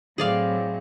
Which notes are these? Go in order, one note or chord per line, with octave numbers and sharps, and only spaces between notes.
A2 F#3 C4 G#4 D5 F5